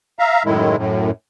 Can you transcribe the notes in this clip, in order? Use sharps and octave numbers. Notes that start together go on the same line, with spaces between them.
E5 F5 A#5
F#2 A2 D#3 G#3 E4
F#2 A2